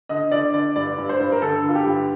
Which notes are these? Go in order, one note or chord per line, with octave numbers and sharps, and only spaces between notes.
D3 D#5
D3 D5
D3 D5
G2 D5
G2
C5
G2
A#4
D3 A4
D3 F4
G4
G2